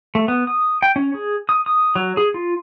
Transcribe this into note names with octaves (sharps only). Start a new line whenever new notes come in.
A3
B3
D#6
G5
C#4
G#4
D#6
D#6
F#3
G#4
F4